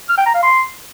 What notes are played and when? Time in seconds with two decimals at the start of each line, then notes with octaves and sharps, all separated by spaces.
0.09 F6
0.18 G5
0.26 A#5
0.34 F5
0.43 C6